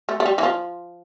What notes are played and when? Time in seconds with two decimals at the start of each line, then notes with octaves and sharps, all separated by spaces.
0.09 A3
0.20 A3
0.26 G3
0.38 E3
0.43 F3